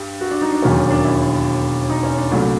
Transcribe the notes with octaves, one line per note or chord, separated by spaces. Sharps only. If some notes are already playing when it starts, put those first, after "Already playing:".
Already playing: G2 G4
F#4
D4
D#4
D4
E1 D#2 D#3 F#3 A#3 C#4
D4
D4
E4
D#4
C#4
D4
C2 A#2 F#3 A3